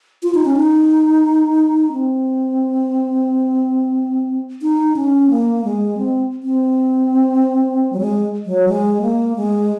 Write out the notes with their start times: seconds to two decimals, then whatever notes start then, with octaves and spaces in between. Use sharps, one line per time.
0.23 F4
0.34 D#4
0.45 C#4
0.57 D#4
1.93 C4
4.62 D#4
4.96 C#4
5.30 A#3
5.64 G#3
5.98 C4
6.43 C4
7.93 F#3
8.00 G#3
8.46 F#3
8.68 G#3
9.02 A#3
9.36 G#3